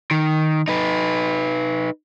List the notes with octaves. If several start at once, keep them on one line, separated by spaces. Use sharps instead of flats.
D#3
D#4 B4